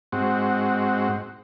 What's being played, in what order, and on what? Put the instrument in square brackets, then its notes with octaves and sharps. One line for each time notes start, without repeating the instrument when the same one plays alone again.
[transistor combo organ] G#2 C4 F#4